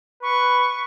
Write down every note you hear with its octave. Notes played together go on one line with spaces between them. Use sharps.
B4 C#6